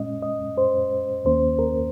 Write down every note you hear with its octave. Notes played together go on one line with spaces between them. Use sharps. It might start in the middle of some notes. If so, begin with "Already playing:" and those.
Already playing: A#2 G#3 C#4 D#5
D#5
C5
D#2 D#3 A#3 C#4 C5
A#4